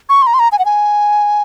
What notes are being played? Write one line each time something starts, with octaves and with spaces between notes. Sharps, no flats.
C#6
C6
A#5
C6
A#5
G#5
F#5
G#5